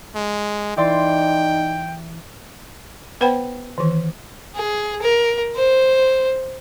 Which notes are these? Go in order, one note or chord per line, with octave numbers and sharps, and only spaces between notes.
G#3
E3 D#4 D5 G5 C6
B3 B4 C5 F#5 G5 B5
D#3 E3
G#4
A#4
C5